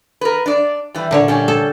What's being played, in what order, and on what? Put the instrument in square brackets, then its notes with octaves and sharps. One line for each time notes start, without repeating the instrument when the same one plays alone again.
[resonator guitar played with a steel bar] A#4 B4
D4 D5
E3 G3
[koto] A#2 D3 C#5 [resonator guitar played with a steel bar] D4
[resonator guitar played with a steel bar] G3 C#4 D4
[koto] A4